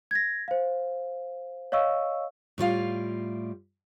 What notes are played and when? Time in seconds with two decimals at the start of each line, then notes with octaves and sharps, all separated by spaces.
0.11 G#6 A#6
0.48 C5 F5
1.72 C#5 D#5 F5 C#6 E6
2.58 A2 G3 F4 F5